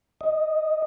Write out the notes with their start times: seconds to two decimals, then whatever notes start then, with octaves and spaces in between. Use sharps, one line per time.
0.21 D#5